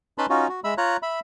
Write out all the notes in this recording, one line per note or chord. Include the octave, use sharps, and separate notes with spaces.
C#4 D#4 B4 A5 B5 C6
C#4 D#4 F4 F#4
F#4
G#3 E5 B5 E6
F4 C#5 A#5 F#6
E5 B5